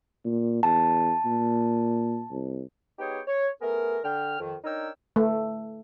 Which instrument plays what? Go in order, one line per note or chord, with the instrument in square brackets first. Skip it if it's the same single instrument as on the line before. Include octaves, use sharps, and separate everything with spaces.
[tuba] A#2
[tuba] E2 [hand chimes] A5
[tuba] A#2
C2
[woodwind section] B3 D#4 G4 G#4 C#5 G5
C#5
A3 B3 G#4 A#4
D3 G5 F6
F2 D#3
D4 D#4 A#4 C#5 G5 E6
[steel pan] A3